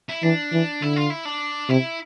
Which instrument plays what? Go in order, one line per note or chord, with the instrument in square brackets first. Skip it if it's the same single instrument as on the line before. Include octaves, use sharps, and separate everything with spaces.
[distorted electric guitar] E4
[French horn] E3 [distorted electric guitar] D4
[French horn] E3
[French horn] D3 [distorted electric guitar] E4
[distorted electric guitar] F4
E4
D4
[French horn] C3 [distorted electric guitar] E4